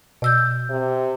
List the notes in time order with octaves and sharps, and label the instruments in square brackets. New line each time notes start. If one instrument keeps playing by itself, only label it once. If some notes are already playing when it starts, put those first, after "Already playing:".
[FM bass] B2 [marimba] D5 E6 G6
[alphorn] C3